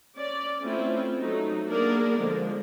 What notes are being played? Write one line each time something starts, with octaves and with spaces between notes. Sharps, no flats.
C#4 D5
A3 C4 C#4 E4 F4
F#3 A3 D#4
A#3 B3 D4 G#4 A#4 D5
D3 F3 G#3